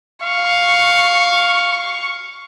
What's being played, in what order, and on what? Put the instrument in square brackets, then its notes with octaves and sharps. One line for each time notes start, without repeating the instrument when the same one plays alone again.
[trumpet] F5 [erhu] C#6